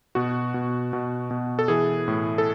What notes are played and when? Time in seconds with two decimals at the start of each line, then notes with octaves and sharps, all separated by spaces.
0.15 B2 F#4
0.54 B2
0.93 B2
1.31 B2
1.59 A4
1.68 E3 G#4
2.08 A2
2.38 A4